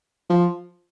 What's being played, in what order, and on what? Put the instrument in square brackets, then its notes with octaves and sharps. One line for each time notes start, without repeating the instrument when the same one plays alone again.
[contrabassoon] F3